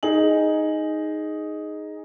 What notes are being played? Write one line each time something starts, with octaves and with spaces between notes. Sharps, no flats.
D#4 G#4 F#7